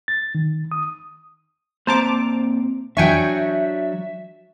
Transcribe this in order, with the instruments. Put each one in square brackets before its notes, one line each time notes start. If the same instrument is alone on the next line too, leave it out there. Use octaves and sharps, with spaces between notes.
[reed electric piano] A6
D#3
D#6
[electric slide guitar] A#2 C4 A#5 [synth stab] C5 A5 D6
[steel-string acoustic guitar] F#3 D4 [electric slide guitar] E5 [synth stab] G5 G#5 C#6